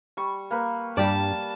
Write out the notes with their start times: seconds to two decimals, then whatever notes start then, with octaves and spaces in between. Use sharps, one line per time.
0.17 G3 C#6
0.51 A#3 B4
0.97 G2 G3 G4 D5 A5